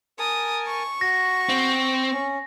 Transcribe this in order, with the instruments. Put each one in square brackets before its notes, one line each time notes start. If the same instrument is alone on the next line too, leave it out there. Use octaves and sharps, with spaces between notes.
[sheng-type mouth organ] A#4 G#5 A5 [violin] D#6
[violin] C#6
[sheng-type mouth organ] F#4 [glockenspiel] A#6
[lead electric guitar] C4
[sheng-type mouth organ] C#4